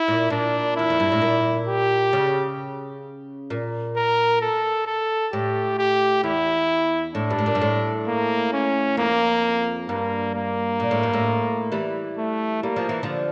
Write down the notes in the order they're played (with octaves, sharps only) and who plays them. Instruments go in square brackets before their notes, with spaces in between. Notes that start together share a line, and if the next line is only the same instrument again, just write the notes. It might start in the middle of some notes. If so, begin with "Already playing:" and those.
Already playing: [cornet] E4
[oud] A#2
[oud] A#2 [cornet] D4
[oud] E2 [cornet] E4
[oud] F2
G2
A2
A#2
[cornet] G4
[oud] C#3
A#2
[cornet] A#4
A4
A4
[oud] A2 [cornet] G4
[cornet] G4
[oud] E2 [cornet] E4
[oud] A2 [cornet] D4
[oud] G2
A2
A#2
G2
A2
[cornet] A#3
C#4
[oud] F2 [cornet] A#3
[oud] G2 [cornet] A#3
[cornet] A#3
[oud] A#2
A2
G2
A2
E3 G3
[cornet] A3
[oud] G3 [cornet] A#3
[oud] F3
E3
D3 F3